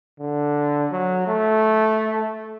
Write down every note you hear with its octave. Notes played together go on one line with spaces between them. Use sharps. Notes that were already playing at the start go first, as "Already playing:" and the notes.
D3
F#3
A3